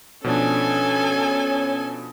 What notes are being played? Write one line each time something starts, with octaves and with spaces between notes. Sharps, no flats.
B2 F3 C#4 D4 A4 G#5